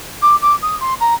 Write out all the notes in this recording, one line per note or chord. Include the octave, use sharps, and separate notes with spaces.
D6
D6
D#6
C6
A#5